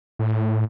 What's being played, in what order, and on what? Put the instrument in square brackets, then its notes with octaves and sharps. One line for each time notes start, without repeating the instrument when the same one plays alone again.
[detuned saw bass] A2